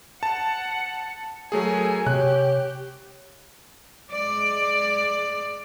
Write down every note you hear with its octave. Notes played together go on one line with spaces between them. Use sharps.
F#5 A5
F#3 A3 G#4 A#4 G#5
C3 G4 C#5 F#6
G#3 D5